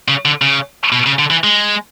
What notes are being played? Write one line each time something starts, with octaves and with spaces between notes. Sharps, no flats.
C#3
D3
C#3
B2
C#3
D3
E3
G#3